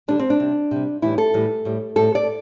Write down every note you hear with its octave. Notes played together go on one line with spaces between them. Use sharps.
D3 G3 D4
C4
D4
C3 G3
C3 G3
A2 E3 G3 E4
A4
A2 E3 G3
A2 G3
A2 G3 A4
D5